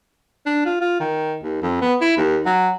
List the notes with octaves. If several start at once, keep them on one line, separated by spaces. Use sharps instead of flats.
D4
F4
F4
D#3
D#2
F2
B3
E4
D#2
F#3